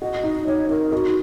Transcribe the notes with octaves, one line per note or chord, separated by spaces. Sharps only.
F#4 D#5
D#4
D#4 C#5
D#4 A#4
D#4 F#4